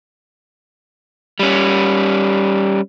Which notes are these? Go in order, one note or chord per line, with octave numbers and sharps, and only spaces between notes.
G3 C#4